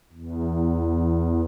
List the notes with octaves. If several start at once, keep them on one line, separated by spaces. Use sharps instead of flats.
E2